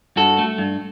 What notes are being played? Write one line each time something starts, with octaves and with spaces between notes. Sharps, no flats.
G2 F#4 A4
A3
G2